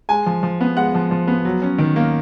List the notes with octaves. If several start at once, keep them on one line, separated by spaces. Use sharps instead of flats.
G#3 G#5
F3
F3
B3
G#3 F#5
F3
F3
B3
F#3
C#4
D#3
A#3